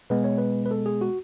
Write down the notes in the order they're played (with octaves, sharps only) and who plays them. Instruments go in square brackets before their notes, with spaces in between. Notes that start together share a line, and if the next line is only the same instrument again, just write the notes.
[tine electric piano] B2 G#3 B3 B4
C#5
B4
B4
A4
G#4
F#4